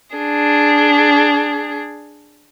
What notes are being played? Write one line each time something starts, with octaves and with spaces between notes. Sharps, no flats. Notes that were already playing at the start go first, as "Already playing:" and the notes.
D4 G#4